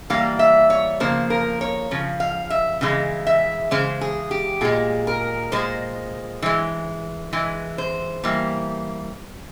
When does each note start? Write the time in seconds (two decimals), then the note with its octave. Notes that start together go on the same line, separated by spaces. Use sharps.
0.10 E3 G3 A#3 F5
0.39 E5
0.70 C#5
1.00 C#3 F3 A#3 C5
1.30 A#4
1.61 C#5
1.91 C#3 F3
2.20 F5
2.50 E5
2.81 C#3 E3 G#3
3.27 E5
3.71 C#3 E3 G#3 C5
4.01 G#4
4.31 G4
4.61 A#2 G#3 G#4
5.07 A#4
5.52 A#2 G#3 C5
6.42 E3 G#3
7.33 E3 G#3
7.78 C5
8.23 E3 G3 A#3